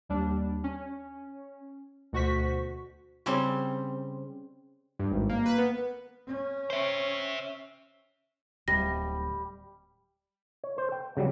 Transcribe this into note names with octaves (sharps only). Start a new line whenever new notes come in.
D#2 G3 D4
C#4
D2 B2 F#4 C5 C#6 B6
C#3 G3 C4
G2
G#1
A#3
B4
B3
C#4
C5 E5
D1 G3 A#6
C#5
C5
G5
C#3 F#3 G3